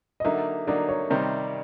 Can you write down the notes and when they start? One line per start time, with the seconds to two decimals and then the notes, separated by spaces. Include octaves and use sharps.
0.20 D#5
0.24 D3 F#3 A#3 D#4 E5
0.67 D3 F#3 A#3 D#4 D5
0.89 C#5
1.10 C3 D#3 G3 C4 D#4